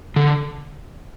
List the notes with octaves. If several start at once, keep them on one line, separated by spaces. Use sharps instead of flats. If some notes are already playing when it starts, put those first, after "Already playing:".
D3